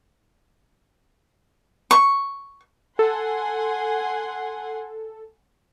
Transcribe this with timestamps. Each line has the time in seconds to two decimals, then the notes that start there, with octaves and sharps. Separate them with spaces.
1.91 C#6
2.99 A4 F#5 G#5 C6